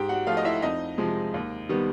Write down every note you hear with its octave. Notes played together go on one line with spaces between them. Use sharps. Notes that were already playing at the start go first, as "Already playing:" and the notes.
Already playing: G#2 G4 G5
F#4 F#5
F3 A3 F4 F5
D#5
E4 E5
F2 D#4 D#5
C3 F3 G#3
D#2
D#3 G3 B3